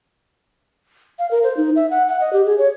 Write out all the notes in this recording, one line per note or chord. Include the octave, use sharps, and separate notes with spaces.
F5
A#4
C5
D#4
E5
F#5
F#5
D#5
G4
G#4
C#5